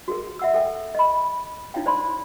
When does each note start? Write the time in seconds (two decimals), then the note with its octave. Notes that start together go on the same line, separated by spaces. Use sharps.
0.08 F#4 G#4 A#4
0.39 E5 F#5 E6
0.54 A4 G5
0.95 D#5 B5
1.74 D#4 E4 C#5 F5 G5
1.86 C5 D5 A5 B5 C6